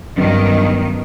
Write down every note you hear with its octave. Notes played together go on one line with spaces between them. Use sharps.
G2 D#3 F#3 B3 C#4